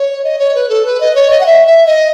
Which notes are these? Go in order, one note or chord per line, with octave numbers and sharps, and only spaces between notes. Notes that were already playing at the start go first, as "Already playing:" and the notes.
Already playing: C#5
D#5
C#5
B4
A4
B4
D#5
C#5
D#5
F#5
E5
E5
D#5